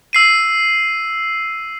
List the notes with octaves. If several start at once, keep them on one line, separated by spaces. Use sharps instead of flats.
E6 C7 D#7